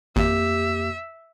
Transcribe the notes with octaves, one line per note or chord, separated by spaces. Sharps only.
G#1 F2 A#3 G4 E5